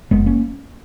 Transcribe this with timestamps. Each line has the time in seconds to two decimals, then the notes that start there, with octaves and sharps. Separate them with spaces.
0.11 F#1 G#3 B3
0.26 A#3 C#4